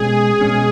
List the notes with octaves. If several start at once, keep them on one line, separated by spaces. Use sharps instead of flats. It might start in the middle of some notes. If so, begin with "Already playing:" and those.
Already playing: B2 G#3 C#4 G#4
B2 G#3 C#4